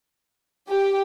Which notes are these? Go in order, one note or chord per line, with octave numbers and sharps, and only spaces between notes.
G4